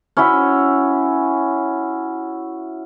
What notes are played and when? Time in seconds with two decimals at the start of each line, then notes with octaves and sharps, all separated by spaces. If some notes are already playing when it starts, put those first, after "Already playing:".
0.17 C#4 E4 F#4 E5